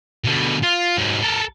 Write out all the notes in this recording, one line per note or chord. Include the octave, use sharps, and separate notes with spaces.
B2 D3
F4
G#2 F#3
A4 A#4